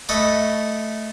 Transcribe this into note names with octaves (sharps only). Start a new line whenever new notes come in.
A3 D#5 F#5 B5 C#6